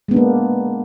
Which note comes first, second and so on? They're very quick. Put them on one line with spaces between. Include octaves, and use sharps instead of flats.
G#3 B3 D4 A#3